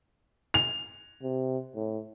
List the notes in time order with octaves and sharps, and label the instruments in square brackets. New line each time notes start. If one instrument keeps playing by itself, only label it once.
[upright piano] F7
[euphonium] C3
A2